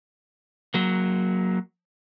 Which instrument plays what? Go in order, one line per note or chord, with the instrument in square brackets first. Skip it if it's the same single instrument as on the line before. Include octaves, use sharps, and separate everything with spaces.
[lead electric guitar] F#3 A#3